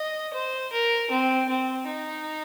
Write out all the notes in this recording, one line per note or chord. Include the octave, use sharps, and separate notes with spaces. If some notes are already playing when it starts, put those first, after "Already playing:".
Already playing: D#5
C5
A#4
C4
C4
D#4